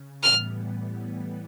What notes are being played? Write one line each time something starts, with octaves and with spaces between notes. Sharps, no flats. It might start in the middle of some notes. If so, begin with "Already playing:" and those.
Already playing: C#3
A2 E3 G3 B3 F6